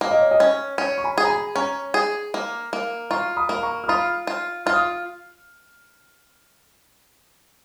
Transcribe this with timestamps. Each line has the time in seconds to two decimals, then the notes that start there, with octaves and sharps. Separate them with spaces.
0.01 A#3 F5
0.11 D#5
0.21 C#5
0.31 D#5
0.40 C#4
0.78 C#4 C#5
0.98 C#6
1.04 G#5 B5
1.18 G#4
1.24 A#5
1.30 G#5 B5
1.55 C#4 A#5 C#6
1.94 G#4
2.34 A#3
2.73 A#3
3.11 F4 A#5 C#6
3.37 B5 D#6
3.49 A#3
3.56 B5
3.62 A#5 C#6
3.84 F6
3.88 F4 B5 D#6
4.27 F4
4.66 F4 F6
4.73 D#6